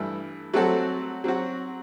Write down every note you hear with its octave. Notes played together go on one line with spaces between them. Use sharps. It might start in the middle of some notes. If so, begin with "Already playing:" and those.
Already playing: G2 E3 A3 E4
F#3 A3 C4 F#4 A4
F#3 C4 F#4